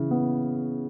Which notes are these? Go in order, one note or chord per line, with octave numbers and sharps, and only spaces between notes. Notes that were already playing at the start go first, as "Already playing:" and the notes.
Already playing: C#3 E3
B3